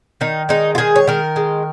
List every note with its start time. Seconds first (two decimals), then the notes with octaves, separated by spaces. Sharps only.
0.21 D#3 D#4
0.49 G#3 D#4
0.75 F4
0.78 D#3 G#4
0.96 C#5
1.07 D#3 A#4
1.36 G#3